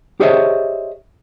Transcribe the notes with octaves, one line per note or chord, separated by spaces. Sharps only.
G4 G#4 C5 C#5 D#5 E5